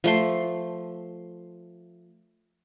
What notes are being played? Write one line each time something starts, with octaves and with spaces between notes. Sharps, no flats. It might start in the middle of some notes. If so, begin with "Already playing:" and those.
F3 A3 C6